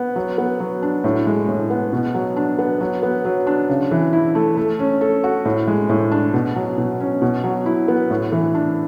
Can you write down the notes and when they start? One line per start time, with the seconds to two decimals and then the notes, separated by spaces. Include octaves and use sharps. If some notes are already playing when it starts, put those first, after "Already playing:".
Already playing: B3
0.16 F#3
0.38 B3
0.60 F#3
0.82 D4
1.04 A2
1.26 G#3
1.48 A2
1.70 B3
1.93 B2
2.14 F#3
2.36 D4
2.58 B3
2.81 F#3
3.03 B3
3.25 F#3
3.47 D4
3.69 C#3
3.91 E3
4.13 E4
4.35 A3
4.57 A3
4.79 C#4
5.01 A4
5.24 F#4
5.45 A2
5.67 G#3
5.89 A2
6.11 D4
6.34 B2
6.56 F#3
6.78 B2
7.00 C#4
7.22 B2
7.44 F#3
7.66 E4
7.88 B3
8.11 A2
8.32 E3
8.55 D4